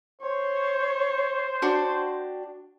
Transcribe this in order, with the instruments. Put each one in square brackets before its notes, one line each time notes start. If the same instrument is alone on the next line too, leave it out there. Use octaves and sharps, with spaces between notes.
[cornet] C5 [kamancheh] C#5
[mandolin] D4 F#4 G5